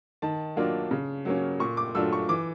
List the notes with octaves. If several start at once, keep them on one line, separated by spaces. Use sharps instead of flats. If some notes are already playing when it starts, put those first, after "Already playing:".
D#3 A5
F#3 A#3 D4 F4
C#3
F#3 A#3 C#4
A#2 C#6
D6
F#3 A3 D4 F4 E6
C#6
E3 D6